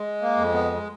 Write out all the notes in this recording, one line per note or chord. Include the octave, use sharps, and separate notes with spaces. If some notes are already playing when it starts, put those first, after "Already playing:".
Already playing: G#3
A#3
F2
B3